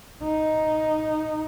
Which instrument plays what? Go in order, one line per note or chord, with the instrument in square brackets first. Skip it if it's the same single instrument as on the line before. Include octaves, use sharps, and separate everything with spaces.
[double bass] D#4